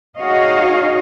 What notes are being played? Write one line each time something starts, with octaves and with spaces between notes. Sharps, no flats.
D#4 F#4 G#4 C#5 D#5 F5